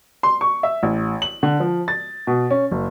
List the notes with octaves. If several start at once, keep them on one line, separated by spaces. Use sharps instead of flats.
C6
C#6
E5
A1
F#7
D3
F3
A6
B2
C#4
F#1